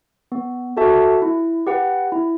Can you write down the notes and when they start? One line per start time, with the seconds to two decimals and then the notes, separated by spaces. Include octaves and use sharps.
0.32 B3
0.77 F#4 A4 E5 A5
1.22 E4
1.67 G4 B4 F#5
2.12 E4